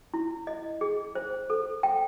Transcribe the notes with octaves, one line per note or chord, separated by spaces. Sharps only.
E4
D#5
G#4
C5
A4
G5